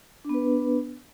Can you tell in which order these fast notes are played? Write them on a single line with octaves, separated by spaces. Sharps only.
D4 B3 B4